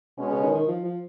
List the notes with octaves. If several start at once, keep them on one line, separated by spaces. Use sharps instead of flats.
B2 G#3 C#4
C#3
D#3
D#3
F3
F3